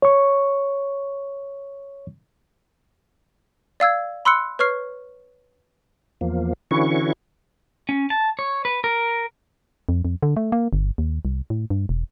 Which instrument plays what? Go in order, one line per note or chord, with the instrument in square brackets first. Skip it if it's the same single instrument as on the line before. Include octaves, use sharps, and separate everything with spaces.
[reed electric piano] C#5 C#6
[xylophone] D5 F5 E6 G#6
B5 C6 E6 F#6 C#7
B4 C#5 C#6 F6 C7
[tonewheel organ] E2 F3 A#3
D3 E3 C#4 E4 F#4 C#6
[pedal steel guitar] C#4
A5
C#5
B4
A#4
[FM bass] F2
F2
D3
A3
A#3
G1
D#2
C2
A2
G2
E1